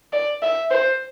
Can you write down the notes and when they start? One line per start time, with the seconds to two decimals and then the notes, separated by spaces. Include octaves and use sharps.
0.13 D5
0.43 E5
0.71 C5